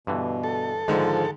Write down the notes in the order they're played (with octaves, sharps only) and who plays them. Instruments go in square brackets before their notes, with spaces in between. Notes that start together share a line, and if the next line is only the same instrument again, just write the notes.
[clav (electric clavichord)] G2 D3 E3 [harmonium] B2
[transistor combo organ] A4
[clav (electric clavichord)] G#2 [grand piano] D3 D#3 G#3 [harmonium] F3